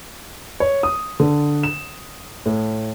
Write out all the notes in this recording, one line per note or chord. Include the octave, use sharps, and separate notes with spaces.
C#5
D#6
D3
E7
A2